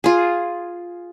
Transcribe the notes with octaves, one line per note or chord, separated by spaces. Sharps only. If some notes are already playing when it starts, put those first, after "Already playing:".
F4 G#4